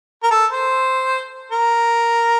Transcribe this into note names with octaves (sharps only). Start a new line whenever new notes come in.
A#4
A4
C5
A#4